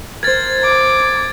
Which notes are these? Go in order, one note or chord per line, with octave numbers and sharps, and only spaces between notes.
A#4 C5 G#6 A6
D6